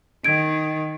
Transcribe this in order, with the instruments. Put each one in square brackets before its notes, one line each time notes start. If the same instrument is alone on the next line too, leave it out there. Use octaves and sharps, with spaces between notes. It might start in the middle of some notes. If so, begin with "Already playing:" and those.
[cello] D#3 [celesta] G#6 D7